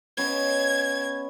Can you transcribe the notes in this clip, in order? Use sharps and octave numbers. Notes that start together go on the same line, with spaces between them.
B3 C#4 D#5 G#6